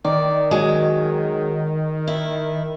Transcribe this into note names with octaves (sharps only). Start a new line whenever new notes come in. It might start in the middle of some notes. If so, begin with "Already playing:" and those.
D#3 D5
F#3 G#3
E4